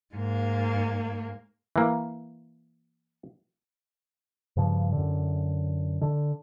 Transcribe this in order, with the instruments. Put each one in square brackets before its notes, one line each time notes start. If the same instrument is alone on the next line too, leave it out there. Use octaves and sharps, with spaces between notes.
[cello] G#2 A#3
[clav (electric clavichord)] E3 A#3
[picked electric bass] G2 C#3 F3
F#2 D3
D3